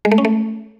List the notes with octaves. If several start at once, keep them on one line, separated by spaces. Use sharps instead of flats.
G#3
A3
C#4
A3